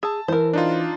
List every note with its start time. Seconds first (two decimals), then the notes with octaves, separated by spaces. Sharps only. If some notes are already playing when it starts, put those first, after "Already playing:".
0.03 G#4 A5 E6
0.28 E3 A#4 C5
0.53 D4 D#4 F4